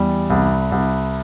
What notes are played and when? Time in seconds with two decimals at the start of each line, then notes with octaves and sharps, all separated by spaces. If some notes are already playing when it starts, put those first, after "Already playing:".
Already playing: E2 G3
0.30 C2
0.72 C2